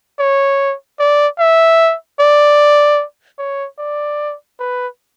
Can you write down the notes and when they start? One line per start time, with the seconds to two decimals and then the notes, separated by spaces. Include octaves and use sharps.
0.19 C#5
1.00 D5
1.39 E5
2.20 D5
3.38 C#5
3.79 D5
4.59 B4